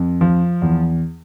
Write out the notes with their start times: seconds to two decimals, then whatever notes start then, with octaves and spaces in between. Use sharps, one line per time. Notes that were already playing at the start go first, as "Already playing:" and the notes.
Already playing: F2
0.21 F3
0.62 E2